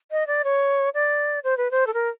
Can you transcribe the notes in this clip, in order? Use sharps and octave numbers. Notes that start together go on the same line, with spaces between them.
D#5
D5
C#5
D5
C5
B4
C5
A4
A#4